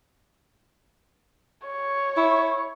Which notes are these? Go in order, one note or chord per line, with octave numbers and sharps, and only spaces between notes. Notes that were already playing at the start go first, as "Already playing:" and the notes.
C#5
E4